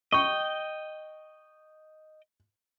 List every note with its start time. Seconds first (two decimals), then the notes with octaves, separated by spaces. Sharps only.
0.12 D#5 G5 C#6